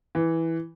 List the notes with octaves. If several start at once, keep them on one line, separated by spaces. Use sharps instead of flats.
E3